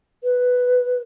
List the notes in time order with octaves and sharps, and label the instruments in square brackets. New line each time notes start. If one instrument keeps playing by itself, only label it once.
[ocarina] B4